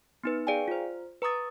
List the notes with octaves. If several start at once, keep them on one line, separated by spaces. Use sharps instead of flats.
B3 D#4 B4
G#4 D5 F5 G5 G#5
F4 C5
B4 A#5 C#6 D#6 A6